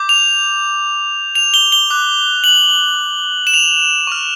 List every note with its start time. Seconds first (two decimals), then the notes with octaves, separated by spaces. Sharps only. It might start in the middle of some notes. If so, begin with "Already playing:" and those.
Already playing: D6 G6
0.09 F7
1.35 F7
1.54 G7
1.72 G7
1.90 D6 F#6
2.44 F#7
3.47 E7
3.54 F7
4.07 C#6 F6